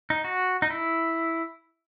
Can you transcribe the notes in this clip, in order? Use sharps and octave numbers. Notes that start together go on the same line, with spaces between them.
D#4
F#4
D#4
E4